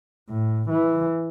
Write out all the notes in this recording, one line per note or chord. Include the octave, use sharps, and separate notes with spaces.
A2
E3